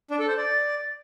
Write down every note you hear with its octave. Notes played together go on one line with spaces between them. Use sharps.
D4
A4
C5
D5